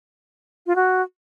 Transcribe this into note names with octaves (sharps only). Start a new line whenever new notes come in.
F4
F#4